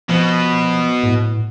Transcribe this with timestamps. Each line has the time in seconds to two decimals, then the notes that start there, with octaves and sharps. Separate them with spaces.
0.09 B2 F3
1.03 A2